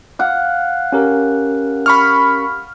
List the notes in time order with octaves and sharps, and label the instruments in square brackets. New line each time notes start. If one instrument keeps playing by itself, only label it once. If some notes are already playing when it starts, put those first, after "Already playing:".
[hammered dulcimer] F5 F#5
[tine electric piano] C#4 G4 A#4
[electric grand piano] B5 C#6 F6